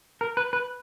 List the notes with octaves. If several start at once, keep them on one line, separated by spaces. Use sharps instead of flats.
A#4
B4
B4